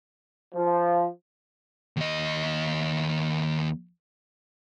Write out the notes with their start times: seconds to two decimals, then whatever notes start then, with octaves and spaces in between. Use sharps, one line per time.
0.55 F3
1.97 D#2 D#5